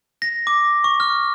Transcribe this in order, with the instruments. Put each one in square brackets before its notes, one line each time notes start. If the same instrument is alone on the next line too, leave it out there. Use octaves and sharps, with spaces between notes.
[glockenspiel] A#6
D6
C#6
F6